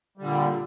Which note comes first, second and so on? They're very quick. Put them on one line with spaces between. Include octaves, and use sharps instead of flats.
G3 D3 A#2